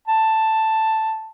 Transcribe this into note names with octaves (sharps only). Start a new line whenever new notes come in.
A5